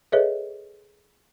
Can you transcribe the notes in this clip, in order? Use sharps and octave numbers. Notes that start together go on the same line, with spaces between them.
G#4 A4 B4 C#5 D#5 E5